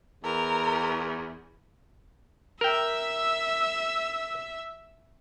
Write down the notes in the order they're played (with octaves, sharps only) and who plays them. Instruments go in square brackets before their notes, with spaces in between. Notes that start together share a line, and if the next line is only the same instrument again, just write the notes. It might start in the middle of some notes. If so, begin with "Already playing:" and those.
[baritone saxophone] E2 [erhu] A#4
[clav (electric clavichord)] A#4 G5 [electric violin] E5 E6